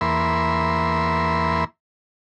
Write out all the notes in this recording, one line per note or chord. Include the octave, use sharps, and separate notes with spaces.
E2 A#3 E5 B5 C6